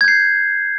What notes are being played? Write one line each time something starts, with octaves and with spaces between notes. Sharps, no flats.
G6 G#6 C7